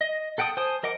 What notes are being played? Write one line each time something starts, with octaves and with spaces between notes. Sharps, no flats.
D#5
A4 F#5 G5 A5 D#6
C5 G#5 A5 D#6
A#4 D#5 F#5 D6